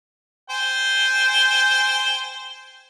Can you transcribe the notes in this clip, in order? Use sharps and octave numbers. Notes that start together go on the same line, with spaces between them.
C5 G5 G#5